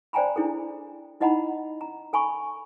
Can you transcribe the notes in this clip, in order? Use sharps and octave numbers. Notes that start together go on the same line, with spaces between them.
C5 D5 G5 G#5 A#5 B5
D4 E4 G#4 A4
D#4 E4 D#5 F#5 A#5 B5
A#5
A4 G#5 B5 C#6